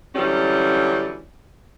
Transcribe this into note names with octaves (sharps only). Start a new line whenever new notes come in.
D3 E3 F#3 G3 C#4